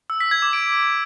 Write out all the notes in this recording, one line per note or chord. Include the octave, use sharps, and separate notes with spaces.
E6
B6
G#6
D6
D7